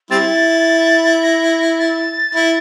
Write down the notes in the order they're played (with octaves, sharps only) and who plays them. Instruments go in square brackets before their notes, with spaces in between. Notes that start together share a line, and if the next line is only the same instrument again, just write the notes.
[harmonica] G3 C4 E4 [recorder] A6
[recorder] A#6
A6
[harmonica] E4